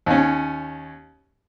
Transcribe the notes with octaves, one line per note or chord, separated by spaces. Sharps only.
D#2 C#4